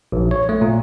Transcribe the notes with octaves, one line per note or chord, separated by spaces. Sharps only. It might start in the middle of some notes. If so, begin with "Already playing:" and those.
A#1
C#5
A3
A#2